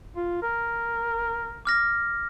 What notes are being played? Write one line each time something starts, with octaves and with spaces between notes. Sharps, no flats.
F4
A#4
D6 F6 A#6